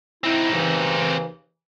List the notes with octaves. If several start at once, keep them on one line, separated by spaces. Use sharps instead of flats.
C4 D#4 E4
D#2 C#3 E3